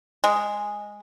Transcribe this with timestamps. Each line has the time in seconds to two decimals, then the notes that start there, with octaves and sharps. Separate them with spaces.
0.24 G#3